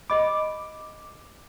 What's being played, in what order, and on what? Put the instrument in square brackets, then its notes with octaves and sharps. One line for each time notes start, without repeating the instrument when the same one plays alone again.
[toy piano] G4 D#5 B5 [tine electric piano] D6